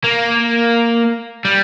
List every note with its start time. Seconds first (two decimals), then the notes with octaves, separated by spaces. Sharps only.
0.04 A#3
1.45 G3